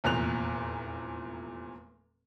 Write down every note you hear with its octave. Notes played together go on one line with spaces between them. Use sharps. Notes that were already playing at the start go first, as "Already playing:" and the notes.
F1 E2 A#2 F#6 F7